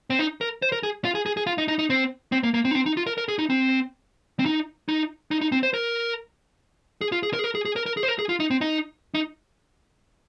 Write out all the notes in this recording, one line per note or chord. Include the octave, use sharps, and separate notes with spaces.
C4
D#4
A#4
C5
A#4
G#4
F4
G#4
G#4
G#4
F4
D#4
D#4
D#4
C4
C4
A#3
A#3
C4
D#4
C4
D#4
F4
A#4
A#4
G#4
D#4
C4
C4
D#4
D#4
D#4
D#4
C4
C5
A#4
G#4
F4
G#4
A#4
G#4
A#4
G#4
G#4
A#4
A#4
G#4
C5
A#4
G#4
F4
D#4
C4
D#4
D#4